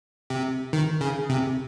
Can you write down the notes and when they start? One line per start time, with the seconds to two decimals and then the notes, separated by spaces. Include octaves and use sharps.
0.30 C3
0.73 D#3
1.01 C#3
1.29 C3